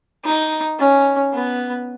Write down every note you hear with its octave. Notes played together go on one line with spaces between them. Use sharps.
D#4
C#4
B3